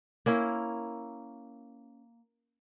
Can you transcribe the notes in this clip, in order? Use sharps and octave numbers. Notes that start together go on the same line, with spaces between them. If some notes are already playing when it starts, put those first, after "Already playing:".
A#3 C#4 E4